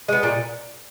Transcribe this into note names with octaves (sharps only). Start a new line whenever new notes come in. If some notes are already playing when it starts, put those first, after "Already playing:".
G#3 B3
A#2